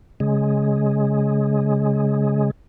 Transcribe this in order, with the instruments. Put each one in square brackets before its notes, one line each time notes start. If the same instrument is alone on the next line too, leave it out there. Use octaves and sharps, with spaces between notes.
[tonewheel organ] C#3 G#3